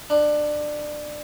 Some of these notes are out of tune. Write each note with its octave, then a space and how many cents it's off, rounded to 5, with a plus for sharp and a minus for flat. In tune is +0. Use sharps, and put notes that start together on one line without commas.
D4 +20